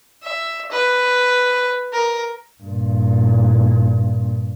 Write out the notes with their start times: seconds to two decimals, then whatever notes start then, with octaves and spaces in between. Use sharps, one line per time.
0.23 E5
0.71 B4
1.93 A#4
2.62 G2 A#2